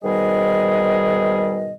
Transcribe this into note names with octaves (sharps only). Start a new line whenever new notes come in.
G#2 B2 D#3 G3 G#4 D#5